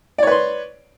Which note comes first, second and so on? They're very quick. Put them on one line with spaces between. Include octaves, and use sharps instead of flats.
D5 C#5 B4 C6